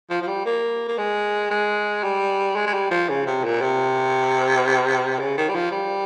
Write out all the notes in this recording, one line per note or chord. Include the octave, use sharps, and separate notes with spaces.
F3
F3
G3
A#3
A#3
G#3
G#3
G3
G#3
G#3
G3
F3
C#3
C3
A#2
C3
C#3
D#3
G3
F3
G3